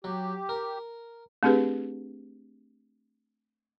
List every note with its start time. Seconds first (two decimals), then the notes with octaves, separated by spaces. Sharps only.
0.04 F#3 G4
0.49 A#4
1.43 A3 C4 D4 G4 G#4 B4